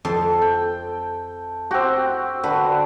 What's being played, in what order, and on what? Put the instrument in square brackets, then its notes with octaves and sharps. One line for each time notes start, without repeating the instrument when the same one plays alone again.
[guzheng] F2 C6 [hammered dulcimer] A4
[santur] G5
[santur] C4 F#4 [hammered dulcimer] G4
[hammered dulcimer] D3 [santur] F#4 [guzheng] B4